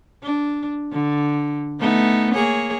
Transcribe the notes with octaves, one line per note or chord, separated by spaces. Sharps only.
D4
D3
A3 B3 D#4
A#3 G#4 C#5